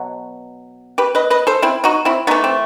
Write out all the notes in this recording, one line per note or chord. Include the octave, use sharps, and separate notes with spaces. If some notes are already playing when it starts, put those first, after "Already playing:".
Already playing: B2 F#3
G4 B4
B4 D#5
B4 D#5
A4 C5
C4 E4
D#4 F#4
C4 E4
E3 A3 B3 D#4
C4